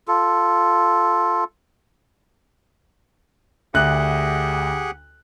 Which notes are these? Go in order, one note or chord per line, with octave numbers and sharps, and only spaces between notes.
F4 A4
D2 G4 G#4 F#5 F#6